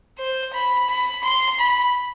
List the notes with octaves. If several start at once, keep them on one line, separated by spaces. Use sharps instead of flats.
C5
B5
B5
C6
B5